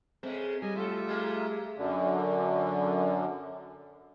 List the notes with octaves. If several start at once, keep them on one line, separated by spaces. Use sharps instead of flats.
C#3 G#3 A3 C4
G3 D#5 G#5
F#3 A3 F4 A4 E5
G#3 A#3 G#4
F#2 D3